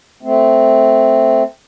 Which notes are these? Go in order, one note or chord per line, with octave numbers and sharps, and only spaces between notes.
A3 C4